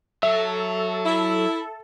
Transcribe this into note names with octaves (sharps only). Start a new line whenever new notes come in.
F#3 A4 E5
E4